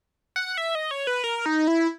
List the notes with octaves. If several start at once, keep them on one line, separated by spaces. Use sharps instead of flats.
F#5
E5
D#5
C#5
B4
A#4
D#4
E4